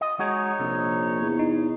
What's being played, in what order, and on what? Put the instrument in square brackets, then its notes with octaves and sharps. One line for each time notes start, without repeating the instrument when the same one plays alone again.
[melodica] F4 [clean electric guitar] D#5
[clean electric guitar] G#3 F#4 G#4 [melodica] D#4 C#5
[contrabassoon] A#1 [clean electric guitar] C3
[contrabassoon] E2
[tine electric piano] D#4